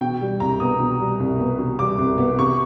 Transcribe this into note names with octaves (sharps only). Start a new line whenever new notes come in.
B2 G5
G3
C2 A#5
B3 D#6
B2
G3
C2
B3
B2
G3 D6
C2
B3
C3 C#6